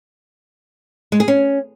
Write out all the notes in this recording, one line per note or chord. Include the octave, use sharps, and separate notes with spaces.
G#3
G#4
C#4